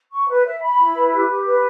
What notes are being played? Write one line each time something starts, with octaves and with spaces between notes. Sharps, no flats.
C#6
B4
E5
B5
E4
B4
G4
G4
B4